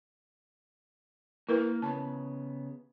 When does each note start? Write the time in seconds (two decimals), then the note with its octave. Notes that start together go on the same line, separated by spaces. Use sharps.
1.49 A#3 E4 A#4 B4
1.82 C#3 B3 A5